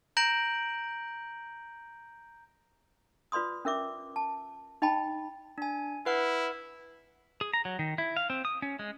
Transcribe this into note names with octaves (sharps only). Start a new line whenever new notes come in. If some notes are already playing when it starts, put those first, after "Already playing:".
A#5 G6 A#6 D7 F#7
F4 B4 D5 C6 D#6
C#4 A#4 E5 D6
A5
D#4 D#5 G5 A5 B5
D4 G#5
E4 B4 F#5 F6
G#4
A#5
F#3
D#3
E4
F5
C4
D#6
C#4
G#3